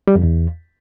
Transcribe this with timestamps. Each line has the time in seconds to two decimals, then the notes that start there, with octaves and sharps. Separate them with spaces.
0.07 G3
0.15 F2
0.23 E2